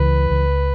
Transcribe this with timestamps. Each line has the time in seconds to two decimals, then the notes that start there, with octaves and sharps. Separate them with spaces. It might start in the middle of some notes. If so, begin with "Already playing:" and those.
Already playing: C#2 E3 B4
0.30 C#2